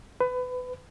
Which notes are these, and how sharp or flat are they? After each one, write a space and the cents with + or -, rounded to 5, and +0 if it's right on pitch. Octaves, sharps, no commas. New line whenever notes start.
B4 +25